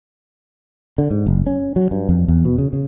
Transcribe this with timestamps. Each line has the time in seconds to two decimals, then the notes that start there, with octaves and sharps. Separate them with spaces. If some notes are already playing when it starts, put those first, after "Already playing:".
0.98 D3
1.10 G#2
1.26 F#1
1.46 C#4
1.76 F#3
1.91 G2
2.09 F2
2.28 E2
2.45 B2
2.58 C#3
2.73 C#3